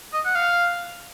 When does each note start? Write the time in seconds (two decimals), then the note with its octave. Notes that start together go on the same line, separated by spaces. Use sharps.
0.13 D#5
0.25 F#5
0.35 F5